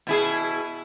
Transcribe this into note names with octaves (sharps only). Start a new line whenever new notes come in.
B2 E4 G#4